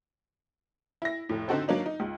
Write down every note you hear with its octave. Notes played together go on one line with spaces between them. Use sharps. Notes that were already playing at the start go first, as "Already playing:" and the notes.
E4 A#6
F1 A2
D3 C4 D#4 F#4 A4 C5
F#3 A#3 D4 D#4
D#4
C#2